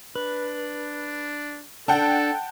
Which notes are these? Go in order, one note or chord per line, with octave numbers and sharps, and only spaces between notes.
D4 B4
D4 A4 F#5 G5 A5